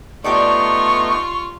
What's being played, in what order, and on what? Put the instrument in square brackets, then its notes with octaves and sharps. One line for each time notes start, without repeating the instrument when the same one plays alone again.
[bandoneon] A3 B3 D#4 [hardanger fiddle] F4 [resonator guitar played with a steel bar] G4 A4 D5 [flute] C#6